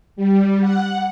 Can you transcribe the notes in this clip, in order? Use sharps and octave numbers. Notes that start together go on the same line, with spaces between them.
G3
F#5